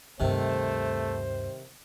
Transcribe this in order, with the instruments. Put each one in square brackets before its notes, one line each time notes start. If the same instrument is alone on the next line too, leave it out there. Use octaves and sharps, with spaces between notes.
[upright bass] D2 G2 [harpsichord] C3 D#3 [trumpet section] A3 [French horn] C5